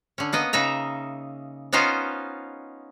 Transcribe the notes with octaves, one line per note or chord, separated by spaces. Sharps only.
D3 C#4
A#3 B3 D#5
C#3 D#4 E5 A#5
B3 C#4 D#4 F4 C5